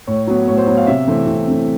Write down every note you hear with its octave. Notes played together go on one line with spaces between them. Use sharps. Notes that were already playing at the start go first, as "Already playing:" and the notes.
A2 C#5
F#3 B3
A2 C#5
C5
F#3 B3 C#5
F5
C3 E5
E3 A3 C4
C3
E3 A3 C4